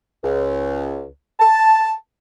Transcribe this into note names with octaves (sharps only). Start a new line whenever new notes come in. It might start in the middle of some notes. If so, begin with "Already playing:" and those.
C#2
A5